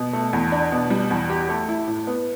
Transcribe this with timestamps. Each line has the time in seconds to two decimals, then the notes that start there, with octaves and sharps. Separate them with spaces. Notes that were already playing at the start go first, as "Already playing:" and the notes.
Already playing: B2
0.13 A3
0.33 E2
0.52 D4
0.72 B2
0.90 G3
1.10 E2
1.30 G4
1.49 A3
1.68 E4
1.88 A2
2.07 B3